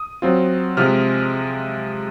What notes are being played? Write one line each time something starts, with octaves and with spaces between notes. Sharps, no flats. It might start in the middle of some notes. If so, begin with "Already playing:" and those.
Already playing: D#6
F#3 C4 F4
C3 F3 G#3 F6